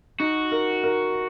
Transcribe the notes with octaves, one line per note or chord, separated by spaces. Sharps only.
D#4 F#4
A#4
A#4